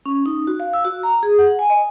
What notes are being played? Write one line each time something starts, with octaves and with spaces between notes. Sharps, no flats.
C#4
D#4
F#4
F5
E6
F#4
A#5
G#4
F#5
G#5
D#5